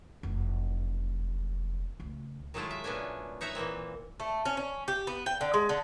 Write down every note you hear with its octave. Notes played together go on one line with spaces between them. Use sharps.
F1 E2
C#2 A3
D#3 F#3 G#3 A3 E4 F4
E5
A#2 A3 B3 C#4 D4 G#5
D#4 C#5 E5 F#5 A#5
A#2 E3 A#3 C4
A3
C#4
C#4
G4
B3
G5
D3
G#3
D3